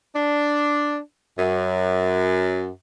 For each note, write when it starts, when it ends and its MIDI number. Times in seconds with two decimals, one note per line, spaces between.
0.15 0.98 62
1.37 2.69 42